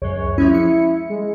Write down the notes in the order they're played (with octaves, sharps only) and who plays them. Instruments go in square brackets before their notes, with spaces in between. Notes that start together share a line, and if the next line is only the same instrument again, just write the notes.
[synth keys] C#2 F#2 [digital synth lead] C#5
[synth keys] F3 G#3 C#4 [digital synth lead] E4
[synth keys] C#7
[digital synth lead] G#3